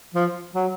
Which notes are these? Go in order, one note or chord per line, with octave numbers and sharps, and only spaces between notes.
F3
F#3